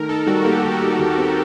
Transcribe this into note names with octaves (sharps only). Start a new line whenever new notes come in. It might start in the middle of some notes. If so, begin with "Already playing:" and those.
Already playing: D#3 A3 A#4
D#4 A4
G3 F#4
A#3 G4
D#3
F#4
D#4
D#2
C4